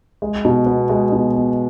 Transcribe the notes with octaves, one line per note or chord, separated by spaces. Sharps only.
G#3
B2
B3
G#3
B2
B3